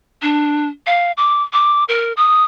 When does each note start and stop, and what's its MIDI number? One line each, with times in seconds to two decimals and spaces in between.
0.22 0.67 62
0.87 1.12 77
1.17 1.43 86
1.53 1.84 86
1.88 2.13 70
2.17 2.44 87